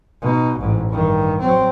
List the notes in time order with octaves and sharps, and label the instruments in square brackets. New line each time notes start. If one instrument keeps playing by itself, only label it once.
[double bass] B2 D#4
A1 G#2
G2 D#3
F#3 C4